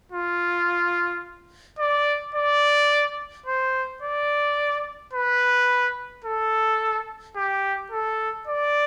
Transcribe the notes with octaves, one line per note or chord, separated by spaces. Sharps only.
F4
D5
D5
C5
D5
B4
A4
G4
A4
D5